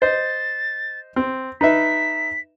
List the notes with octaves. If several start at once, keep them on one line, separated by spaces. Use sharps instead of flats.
C5 D#5 A6
C4
D#4 B4 E5 B6